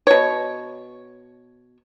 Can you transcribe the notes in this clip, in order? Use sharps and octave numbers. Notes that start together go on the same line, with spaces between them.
B2 C#5